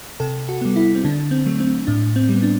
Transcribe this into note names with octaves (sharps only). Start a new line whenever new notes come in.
C3 A4
F#4
G3 B3
E4
C4
D3 D4
C4
F#3 A3
C4
A2 D4
C4
G3 B3
D4